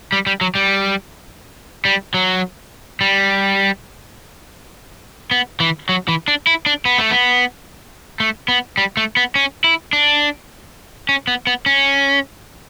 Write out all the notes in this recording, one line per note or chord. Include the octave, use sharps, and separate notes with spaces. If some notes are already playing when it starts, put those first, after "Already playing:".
G3
G3
F#3
G3
G3
F#3
G3
B3
E3
F#3
E3
D4
E4
D4
B3
A3
B3
A3
B3
G3
A3
B3
C#4
E4
D4
C#4
B3
B3
C#4